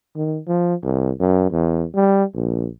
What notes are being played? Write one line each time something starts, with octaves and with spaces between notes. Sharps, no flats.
D#3
F3
C2
F#2
E2
G3
A#1